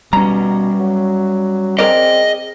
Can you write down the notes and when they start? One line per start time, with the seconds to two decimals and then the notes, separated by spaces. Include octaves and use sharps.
0.13 B2 G3 C#4 A#5
0.79 F#3
1.79 C4 G#4 A#4 D5 D#5